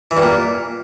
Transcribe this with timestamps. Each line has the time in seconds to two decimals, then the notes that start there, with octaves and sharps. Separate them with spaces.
0.11 E3
0.17 G2
0.22 A#2